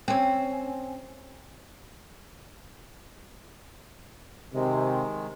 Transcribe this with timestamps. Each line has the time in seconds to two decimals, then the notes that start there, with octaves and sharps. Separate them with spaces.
0.08 C4 C#4
4.54 C3 D#3 G#3